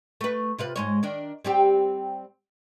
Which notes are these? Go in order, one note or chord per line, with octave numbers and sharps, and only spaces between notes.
A3 B4
C3 F4 B4
G#2 G#3 C#5
D#3 D4
G3 C4 G4